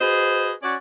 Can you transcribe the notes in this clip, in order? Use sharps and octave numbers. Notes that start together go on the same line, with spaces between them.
F#4 G#4 B4 C5 D#5
C#4 F#4 D5